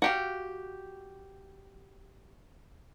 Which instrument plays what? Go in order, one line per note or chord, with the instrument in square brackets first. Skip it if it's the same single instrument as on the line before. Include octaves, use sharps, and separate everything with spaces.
[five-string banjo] F#4 G4 F5